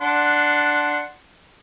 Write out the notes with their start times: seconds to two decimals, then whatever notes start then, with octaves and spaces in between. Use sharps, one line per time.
0.01 D4 F#5 C6